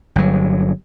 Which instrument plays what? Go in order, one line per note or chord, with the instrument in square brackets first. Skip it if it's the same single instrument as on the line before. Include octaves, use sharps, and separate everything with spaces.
[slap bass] G1 F#3